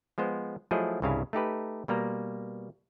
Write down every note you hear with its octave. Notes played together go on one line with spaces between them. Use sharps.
F3 G#3 B3 C5
F3 F#3 A3 E4 G#4 D#5
C2 G2 C#3 E4 F5 G#5
A3 D#4 G4 B4
B2 G3 A#3 A#5